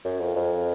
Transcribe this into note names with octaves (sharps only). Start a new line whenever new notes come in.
F#2
F2
F2